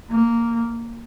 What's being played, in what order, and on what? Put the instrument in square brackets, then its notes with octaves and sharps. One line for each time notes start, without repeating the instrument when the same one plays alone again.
[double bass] A#3